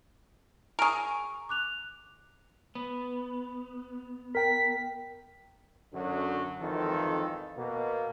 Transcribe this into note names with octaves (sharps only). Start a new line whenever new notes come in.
G#4 A#4 G#5 A#5 C#6
D6 F#6 F7
B3
A#4 G5 B6
F#2 D3 F#3
G#1 F2 D#3 E3 F4 A4
B2 A#3